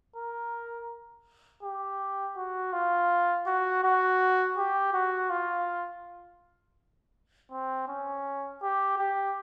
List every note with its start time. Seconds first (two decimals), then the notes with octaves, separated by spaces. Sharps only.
0.16 A#4
1.63 G4
2.37 F#4
2.73 F4
3.47 F#4
3.83 F#4
4.58 G4
4.93 F#4
5.30 F4
7.52 C4
7.88 C#4
8.62 G4
8.98 G4